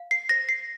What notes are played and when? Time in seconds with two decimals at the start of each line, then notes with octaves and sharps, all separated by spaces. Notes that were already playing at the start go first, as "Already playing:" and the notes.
Already playing: F5
0.11 C7
0.29 C5 A#6
0.49 C7